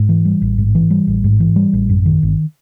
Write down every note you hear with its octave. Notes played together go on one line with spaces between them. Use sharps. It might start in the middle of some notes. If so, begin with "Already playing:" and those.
Already playing: G#2
E3
G3
A1
G#2
E3
G3
A1
G#2
E3
G3
A1
F#2
D#3
G1